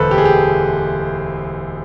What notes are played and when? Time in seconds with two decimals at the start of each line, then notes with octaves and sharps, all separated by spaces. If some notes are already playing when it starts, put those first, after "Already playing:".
Already playing: E1 D2 A4 B4 C5
0.11 G4
0.18 G#4
0.25 G4